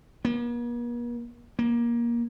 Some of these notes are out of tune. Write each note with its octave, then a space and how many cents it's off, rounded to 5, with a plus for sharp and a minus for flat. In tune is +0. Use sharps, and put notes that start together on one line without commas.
A#3 +45
A#3 +20